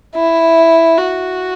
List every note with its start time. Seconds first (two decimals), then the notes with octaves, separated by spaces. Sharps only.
0.16 E4
0.97 F#4